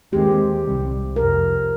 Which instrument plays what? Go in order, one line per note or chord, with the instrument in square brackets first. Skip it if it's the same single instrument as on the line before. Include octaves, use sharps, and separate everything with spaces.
[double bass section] D#2 D#3 G#3 C4 [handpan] G4
[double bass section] C2 C3 G3
[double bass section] F2 C3 F3 [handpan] A#4